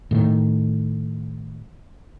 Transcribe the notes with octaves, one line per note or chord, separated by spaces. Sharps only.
A2 D#3